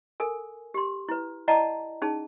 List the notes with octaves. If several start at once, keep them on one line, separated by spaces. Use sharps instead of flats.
A4 A#4 G#5
G4 C6
E4 B4
E4 D5 D#5 F#5 A5 A#5
C#4 D#4 G#4 A5